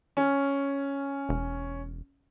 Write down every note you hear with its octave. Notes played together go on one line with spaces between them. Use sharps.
C#4
E1